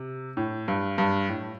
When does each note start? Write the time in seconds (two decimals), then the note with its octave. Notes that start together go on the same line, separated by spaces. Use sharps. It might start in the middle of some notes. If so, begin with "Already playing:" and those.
Already playing: C3
0.37 A2
0.68 G2
0.98 G2
1.29 A2